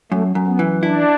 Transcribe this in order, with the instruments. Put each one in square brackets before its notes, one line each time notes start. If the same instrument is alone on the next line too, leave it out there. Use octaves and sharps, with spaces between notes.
[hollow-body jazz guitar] F#2 [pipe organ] A3
[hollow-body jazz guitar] F#2
[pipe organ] B3
[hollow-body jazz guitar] E3
[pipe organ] D4 [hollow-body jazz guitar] E4